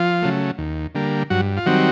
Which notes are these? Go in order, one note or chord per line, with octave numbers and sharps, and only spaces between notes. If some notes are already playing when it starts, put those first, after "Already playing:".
Already playing: F3 F4
C#3 F#3 A3
D#2
D3 G3 A#3
G2 F#3 F#4
F4
D#3 F#3 G3 C4 F#4